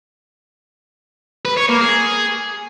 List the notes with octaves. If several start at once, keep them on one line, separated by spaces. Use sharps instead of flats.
B4
C#5
A#3
G#4